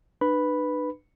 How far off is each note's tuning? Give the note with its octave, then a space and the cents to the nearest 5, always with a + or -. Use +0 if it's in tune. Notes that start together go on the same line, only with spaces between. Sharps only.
D4 +45 B4 +0 B5 +0